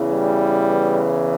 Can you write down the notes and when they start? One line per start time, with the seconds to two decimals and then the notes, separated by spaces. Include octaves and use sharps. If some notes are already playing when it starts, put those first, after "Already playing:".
Already playing: E2 C#3 E3
0.11 G3